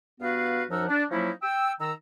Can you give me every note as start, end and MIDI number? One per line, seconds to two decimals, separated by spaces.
0.21 0.63 43
0.21 0.63 59
0.21 0.63 66
0.21 0.63 71
0.21 0.63 77
0.70 0.86 42
0.70 0.86 53
0.70 0.86 63
0.70 0.86 70
0.70 0.86 78
0.70 0.86 88
0.89 1.04 62
1.11 1.30 53
1.11 1.30 54
1.11 1.30 58
1.11 1.30 61
1.11 1.30 63
1.11 1.30 64
1.42 1.72 79
1.42 1.72 88
1.80 1.92 51
1.80 1.92 82
1.80 1.92 88